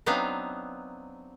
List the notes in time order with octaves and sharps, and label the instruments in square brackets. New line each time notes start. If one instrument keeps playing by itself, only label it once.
[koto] F#3 B3 C4 D4 D#4 F5